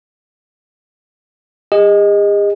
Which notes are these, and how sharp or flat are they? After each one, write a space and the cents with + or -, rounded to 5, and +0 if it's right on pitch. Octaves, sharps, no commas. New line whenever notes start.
G#4 -45 D#5 +0